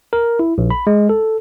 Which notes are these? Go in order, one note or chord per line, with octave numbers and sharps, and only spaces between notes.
A#4
E4
A#1
B5
G#3
A4